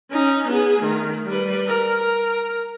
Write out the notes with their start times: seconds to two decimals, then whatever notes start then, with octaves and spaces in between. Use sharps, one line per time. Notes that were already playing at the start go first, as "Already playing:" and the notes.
0.12 C#4 D#4
0.48 B3 G#4
0.80 D#3 A3
1.27 G3 B4
1.67 A#4
2.00 A#4